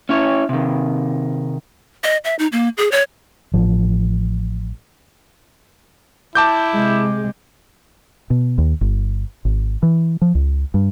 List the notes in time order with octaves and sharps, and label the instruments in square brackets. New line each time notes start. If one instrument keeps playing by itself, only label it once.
[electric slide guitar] C#4 E4 C#5
C3 D#3
[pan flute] D#5
E5
D#4
A#3
G#4
C#5
[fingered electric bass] A1 F3
[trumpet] E4 [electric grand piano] A5 D6 G6
[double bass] C3 G#3
[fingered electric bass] B2
D#2
G1
G#1
E3
F3
C#2
G2